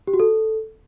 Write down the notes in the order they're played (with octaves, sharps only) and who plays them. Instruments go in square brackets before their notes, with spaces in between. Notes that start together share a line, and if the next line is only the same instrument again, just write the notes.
[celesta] G4
F#4
A4